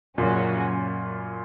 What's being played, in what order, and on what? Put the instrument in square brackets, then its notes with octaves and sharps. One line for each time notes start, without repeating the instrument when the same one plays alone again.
[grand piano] F#2 A#2 [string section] C#3 F#3 C#4 F#4